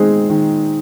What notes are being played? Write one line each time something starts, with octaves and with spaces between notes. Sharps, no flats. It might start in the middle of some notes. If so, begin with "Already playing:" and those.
Already playing: D#3 G#3 C4 D#4 G#4
D#3